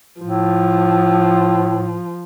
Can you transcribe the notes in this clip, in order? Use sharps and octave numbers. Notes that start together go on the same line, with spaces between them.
A2 F3